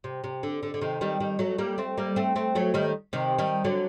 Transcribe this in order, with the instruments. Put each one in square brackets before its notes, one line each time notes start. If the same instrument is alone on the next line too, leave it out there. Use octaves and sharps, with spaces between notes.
[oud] C3
C3
D3
D3
D3
C3 D#3
D#3 G3
D#3 G3
F#3 A3
G3 A#3
A3 C4
G3 A#3
A3 C4
A3 C4
F#3 A3
D#3 G3
C3 D#3
D#3 G3
D3 F#3